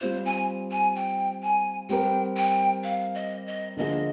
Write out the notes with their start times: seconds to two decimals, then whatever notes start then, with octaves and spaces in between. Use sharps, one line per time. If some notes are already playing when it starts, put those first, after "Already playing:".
0.01 G3 C4 F4 C5
0.25 G#5
0.71 G#5
0.95 G5
1.42 G#5
1.89 G3 C4 G4 A#4 G5
2.36 G5
2.84 F5
3.14 D#5
3.46 D#5
3.77 D3 F3 A#3 F4 G#4 D#5